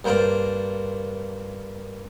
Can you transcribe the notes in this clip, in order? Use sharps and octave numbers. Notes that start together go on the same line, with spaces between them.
G2 A#3 C5 D5 F5